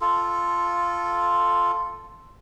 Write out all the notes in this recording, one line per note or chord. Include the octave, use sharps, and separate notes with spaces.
F4 A4